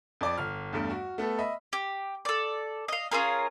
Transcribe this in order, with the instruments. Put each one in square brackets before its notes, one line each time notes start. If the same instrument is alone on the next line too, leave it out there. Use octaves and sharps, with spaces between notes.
[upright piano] F2 D5 D6
G1 F6
E2 G2 A3
F#4
A3 B3 A4
D#5 E5 B5
[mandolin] G4
A4 D5
D#5 F5
C#4 F4 G#4 A#4